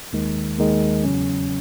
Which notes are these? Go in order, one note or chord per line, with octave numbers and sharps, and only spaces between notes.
D#2 D#3 G#3
D#2 D#3 G#3
E2 C#3 F#3 C#4